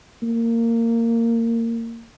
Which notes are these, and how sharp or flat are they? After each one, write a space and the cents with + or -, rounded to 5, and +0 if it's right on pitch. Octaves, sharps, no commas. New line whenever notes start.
A#3 -20